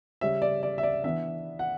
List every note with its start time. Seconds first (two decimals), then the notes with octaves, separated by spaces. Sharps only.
0.21 C#3 G3 C#4 E5
0.42 D5
0.63 D5
0.78 E5
0.83 D5
1.04 E3 B3 D4 E5
1.59 F#5